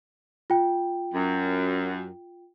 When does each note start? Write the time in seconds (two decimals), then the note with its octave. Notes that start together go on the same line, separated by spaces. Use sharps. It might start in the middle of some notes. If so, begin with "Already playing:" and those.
0.50 F4 G5
1.14 F#2